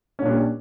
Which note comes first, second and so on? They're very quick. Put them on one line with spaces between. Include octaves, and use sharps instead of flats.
C#4 A#2 D4 G3